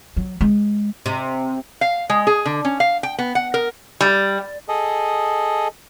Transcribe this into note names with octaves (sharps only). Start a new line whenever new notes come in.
F#3
G#3
C3
F5
G#3
G#4
D3
C#4
F5
G5
B3
F#5
A#4
G3
G#4 A4 D#5